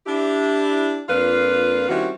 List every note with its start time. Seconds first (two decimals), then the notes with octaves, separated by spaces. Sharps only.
0.07 D4 E4 G4
1.08 F2 A#3 D4 F4 B4 F5
1.89 D#3 G3 C4 C#4 E4 F#4